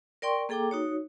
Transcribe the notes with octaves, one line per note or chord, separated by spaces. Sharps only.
A#4 D5 G5 C6 C#6
A#3 G#4 A4 G5 A#5 D6
D#4 F#4 C#5